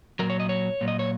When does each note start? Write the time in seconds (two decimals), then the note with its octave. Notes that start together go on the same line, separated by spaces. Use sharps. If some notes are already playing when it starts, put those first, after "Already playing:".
0.19 A#2 F#3 A#4
0.30 C#5
0.40 D#5
0.49 C#5
0.81 A#2 F#3
0.88 D#5
0.99 C#5